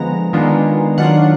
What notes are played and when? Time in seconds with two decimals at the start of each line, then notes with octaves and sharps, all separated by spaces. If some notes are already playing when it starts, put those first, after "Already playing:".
Already playing: D3 F3 G#3 B3 A#5
0.33 D#3 G#3 B3 D4 F4
0.98 D#3 F#3 D4 F4 F#5